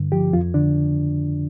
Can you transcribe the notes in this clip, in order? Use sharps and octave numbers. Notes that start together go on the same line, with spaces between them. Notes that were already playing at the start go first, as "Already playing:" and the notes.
Already playing: G2 D3
F3 G4
F2 F4
D3 D4